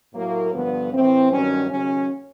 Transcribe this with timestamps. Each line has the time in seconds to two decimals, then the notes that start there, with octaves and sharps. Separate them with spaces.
0.13 A2 F#3 A#3
0.52 G2 D3 F3 B3
0.91 A2 E3 C4
1.30 G2 D#3 F#3 C#4
1.69 D#2 C#3 F#3 C#4